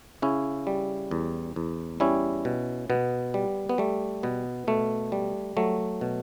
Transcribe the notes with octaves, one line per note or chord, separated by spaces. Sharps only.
C#3 C#4 E4
G3
E2
E2
G3 C#4 E4
B2
B2 B3
G3
B3
G3 A3
B2 B3
B2 A3
G3
F#3 A3
B2